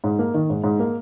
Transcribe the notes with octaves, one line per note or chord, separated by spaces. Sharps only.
G#2
A#3
D#3
G#2
G#2
A#3